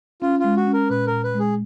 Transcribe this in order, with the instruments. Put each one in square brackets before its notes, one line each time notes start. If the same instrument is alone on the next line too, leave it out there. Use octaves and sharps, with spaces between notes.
[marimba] C#4 [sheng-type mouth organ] F4
[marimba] G#3 [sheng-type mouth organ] F4
[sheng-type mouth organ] F#4
[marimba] C#4
[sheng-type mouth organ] A#4
[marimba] A#2 [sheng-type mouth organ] B4
[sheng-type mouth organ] A#4
[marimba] A#2
[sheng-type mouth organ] B4
[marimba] G#3 [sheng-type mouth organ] G#4